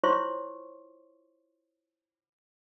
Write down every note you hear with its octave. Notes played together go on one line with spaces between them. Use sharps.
E4 F4 C5 C#5 C6 C#6